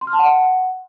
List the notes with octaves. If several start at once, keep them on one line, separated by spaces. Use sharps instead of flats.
C6
F6
A5
F#5